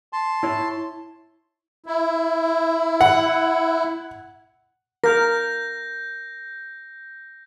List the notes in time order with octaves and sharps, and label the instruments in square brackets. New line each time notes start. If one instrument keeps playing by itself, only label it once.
[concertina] A5 C6
[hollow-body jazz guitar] E4 C#5
[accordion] E4
[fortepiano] F#5
[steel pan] A#4 [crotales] G6 A#6